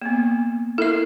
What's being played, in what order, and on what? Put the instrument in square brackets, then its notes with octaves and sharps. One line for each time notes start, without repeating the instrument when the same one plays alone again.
[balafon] A#3 B3
[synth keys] E4 [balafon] A4 A#4 E5